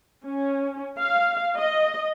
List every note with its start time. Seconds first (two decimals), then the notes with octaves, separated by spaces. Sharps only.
0.25 C#4
0.97 F5
1.57 D#5